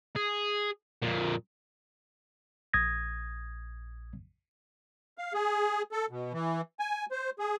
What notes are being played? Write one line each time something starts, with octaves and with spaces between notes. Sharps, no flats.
G#4
F2 A#2
A#1 D#6 G#6 A#6
F5
G#4
A4
B2
E3
G#5
C5
G#4